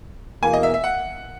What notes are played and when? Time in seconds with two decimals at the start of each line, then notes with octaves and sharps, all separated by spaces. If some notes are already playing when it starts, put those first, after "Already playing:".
0.43 E2 B2 A#3 G#5
0.53 D#5
0.63 E5
0.74 E5
0.84 F#5